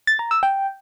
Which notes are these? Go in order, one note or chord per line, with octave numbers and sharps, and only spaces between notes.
A6
A#5
E6
G5